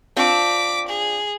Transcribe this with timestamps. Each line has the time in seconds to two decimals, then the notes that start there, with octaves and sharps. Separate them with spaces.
0.16 C4 D4 F4 D6 B6
0.88 G#4